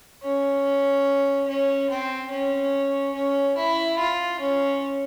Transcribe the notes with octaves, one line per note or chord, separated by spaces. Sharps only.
C#4
C#4
C4
C#4
C#4
E4
F4
C#4